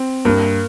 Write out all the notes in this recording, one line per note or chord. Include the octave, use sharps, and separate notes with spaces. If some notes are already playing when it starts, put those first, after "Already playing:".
Already playing: C4
G2 A#3